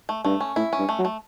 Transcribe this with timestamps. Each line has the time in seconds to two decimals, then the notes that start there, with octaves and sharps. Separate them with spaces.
0.09 A3
0.25 G2 A3
0.41 C#4
0.56 A2 E4
0.73 C#4
0.79 G2
0.89 A3
0.99 F#3
1.05 A3